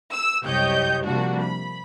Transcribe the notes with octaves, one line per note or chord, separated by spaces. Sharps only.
E6
C2 F#2 G4 C#5 D#5 G6
C3 F3 G3 A#3 D4 F#4
B5